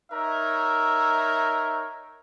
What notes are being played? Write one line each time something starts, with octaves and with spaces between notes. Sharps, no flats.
D#4 A#4 C#5 E5